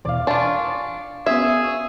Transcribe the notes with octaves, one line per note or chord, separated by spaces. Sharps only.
E2 B2 E3 D5 F5
D4 F4 G#5 C#6 A6
B3 C#4 F#4 G#4 E5
C#6 E6